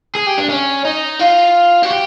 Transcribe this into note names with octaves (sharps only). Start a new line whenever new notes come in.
G#4
G4
D4
C#4
D#4
F4
F#4
G4